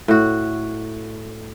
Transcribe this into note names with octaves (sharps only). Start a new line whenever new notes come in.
A2 F#4